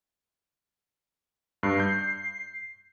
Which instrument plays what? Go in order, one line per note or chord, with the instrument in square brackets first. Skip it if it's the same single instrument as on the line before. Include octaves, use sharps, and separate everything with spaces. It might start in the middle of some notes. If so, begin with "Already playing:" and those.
[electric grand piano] G2 [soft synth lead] C7
[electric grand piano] G6